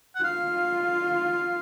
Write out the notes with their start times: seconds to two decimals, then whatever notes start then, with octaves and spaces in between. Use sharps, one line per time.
0.15 F#5
0.24 F4 F5